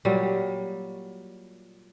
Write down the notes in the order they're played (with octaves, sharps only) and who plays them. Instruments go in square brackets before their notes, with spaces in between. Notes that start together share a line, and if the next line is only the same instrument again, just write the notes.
[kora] A#2 F#3 G3